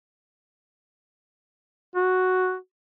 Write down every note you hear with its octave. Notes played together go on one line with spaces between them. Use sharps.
F#4